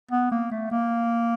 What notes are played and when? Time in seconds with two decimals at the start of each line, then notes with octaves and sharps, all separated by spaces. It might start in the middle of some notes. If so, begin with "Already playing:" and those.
0.12 B3
0.31 A#3
0.51 A3
0.71 A#3